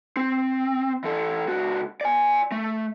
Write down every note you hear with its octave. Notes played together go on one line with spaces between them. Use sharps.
C4
E3 A4
C#2 F#4
D5 G#5
A3